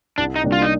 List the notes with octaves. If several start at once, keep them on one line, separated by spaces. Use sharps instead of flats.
C2 D4
D#4
C3 G3 A#3 D4
F4
D#4